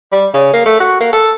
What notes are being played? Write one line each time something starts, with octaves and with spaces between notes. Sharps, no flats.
G3
C#3
A#3
A3
F#4
A#3
A4